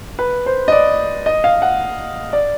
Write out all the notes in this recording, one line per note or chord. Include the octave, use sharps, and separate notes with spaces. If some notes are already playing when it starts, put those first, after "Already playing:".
B4
C5
D#5
D5
D#5
F5
F#5
D5